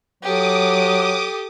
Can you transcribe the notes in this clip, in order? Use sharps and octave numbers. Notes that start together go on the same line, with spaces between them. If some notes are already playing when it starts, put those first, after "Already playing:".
F#3 G4 A4 D6 D#6